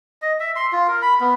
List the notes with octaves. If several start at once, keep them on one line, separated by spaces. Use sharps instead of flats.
D#5
E5
C6
F4
A#4
B5
B3